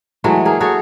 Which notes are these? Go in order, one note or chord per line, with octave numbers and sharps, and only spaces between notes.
E3 F#3 G#3 A3
A#3 G#4
F#4 G#4 A4 C#5